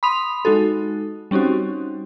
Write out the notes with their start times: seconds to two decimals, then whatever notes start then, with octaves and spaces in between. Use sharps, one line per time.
0.03 B5 C6 D#6 F7
0.45 G#3 D#4 F#4 A4
1.31 G3 C4 C#4 D#4 F#4